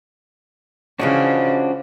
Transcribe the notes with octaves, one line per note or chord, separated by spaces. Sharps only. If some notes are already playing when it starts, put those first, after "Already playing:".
C#3 E3 F3 G#3 C#4 D4 F#4